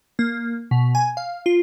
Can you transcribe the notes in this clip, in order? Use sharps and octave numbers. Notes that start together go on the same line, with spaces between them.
A#3
B2
G#5
F5
F4